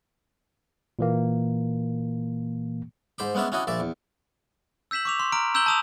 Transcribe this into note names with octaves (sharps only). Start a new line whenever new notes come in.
A#2 E3 A#3
G#2 C5 B5 D6
G#3 B3 C#4 D4 E5
C#4 D4 E4 F#4 D#5
A#1 A#2 D5 E5
E2
E6 G6 B6 E7 F#7
C#6 D6 F7
C6
A#5 F6 D7
A#5 E6 G6 E7 F#7 G7
A5 D#6 F7